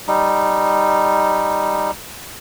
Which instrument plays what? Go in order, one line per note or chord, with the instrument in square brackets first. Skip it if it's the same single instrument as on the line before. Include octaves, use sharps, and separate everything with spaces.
[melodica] G3 D#4